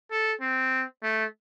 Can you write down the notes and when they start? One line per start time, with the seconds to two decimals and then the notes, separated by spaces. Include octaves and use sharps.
0.11 A4
0.41 C4
1.03 A3